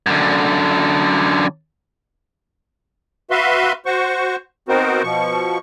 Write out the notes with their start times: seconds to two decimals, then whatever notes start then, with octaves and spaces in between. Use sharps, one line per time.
0.06 F#2 D3
3.31 F#4 B4 E5 F5 C6
3.86 F#4 C5 C#6
4.68 B3 C4 D#4 F#4 A#4 C5
5.03 B2 F3 C#6